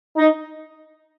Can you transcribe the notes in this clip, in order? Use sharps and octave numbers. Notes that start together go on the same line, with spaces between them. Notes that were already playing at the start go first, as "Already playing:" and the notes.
D#4